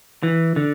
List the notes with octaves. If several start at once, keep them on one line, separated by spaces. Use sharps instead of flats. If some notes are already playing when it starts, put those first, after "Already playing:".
E3
D3